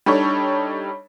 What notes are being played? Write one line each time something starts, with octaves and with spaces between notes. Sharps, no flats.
G3 D4 D#4 A4 C#5